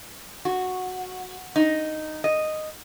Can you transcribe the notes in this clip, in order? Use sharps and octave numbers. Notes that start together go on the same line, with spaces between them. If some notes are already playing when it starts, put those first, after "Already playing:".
F#4
D#4
D#5